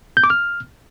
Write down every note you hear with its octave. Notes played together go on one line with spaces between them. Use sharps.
G6
D6
F6